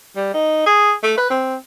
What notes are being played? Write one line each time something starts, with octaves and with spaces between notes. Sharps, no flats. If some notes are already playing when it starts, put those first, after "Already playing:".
G3
D#4
G#4
A3
B4
C4